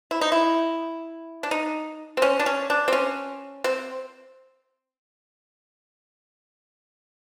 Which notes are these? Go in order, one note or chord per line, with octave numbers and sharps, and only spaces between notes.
E4
D#4
E4
D4
D#4
C4
C#4
D4
C#4
D4
C4
C#4
C4